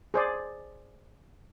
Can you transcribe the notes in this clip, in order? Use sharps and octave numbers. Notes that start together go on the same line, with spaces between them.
G#4 C5 D5